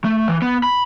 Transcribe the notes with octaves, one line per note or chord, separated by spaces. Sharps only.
A3
E3
B3
B5